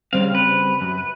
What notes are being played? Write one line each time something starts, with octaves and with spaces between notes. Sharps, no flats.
C#3 G3 C4 F5
B4
F#2